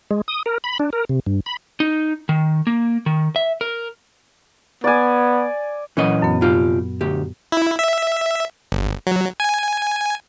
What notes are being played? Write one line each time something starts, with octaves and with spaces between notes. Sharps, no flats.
G#3
D#6
A#4
B5
D4
A#4
C3
G2
B5
D#4
D#3
A#3
D#3
E5
A#4
B3 D5 G#5
A#2 E3 F#3 C#4 D#5
F#2 B3
C3 F4 G4
D2 G4
E4
E5
G1
F#3
G#5